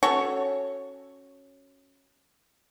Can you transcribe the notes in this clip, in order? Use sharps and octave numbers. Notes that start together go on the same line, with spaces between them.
C#4 F#4 A4 C#5